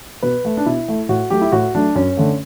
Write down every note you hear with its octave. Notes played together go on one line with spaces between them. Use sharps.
B2 B4
A3
D4
B2 E4
A3
A2 F#4
F#3 A3 G4
E4
A2 F#4
F#3 A3 D4
F#2 C#4
D3 A3